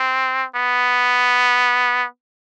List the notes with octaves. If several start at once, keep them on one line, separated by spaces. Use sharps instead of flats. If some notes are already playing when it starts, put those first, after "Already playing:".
Already playing: C4
B3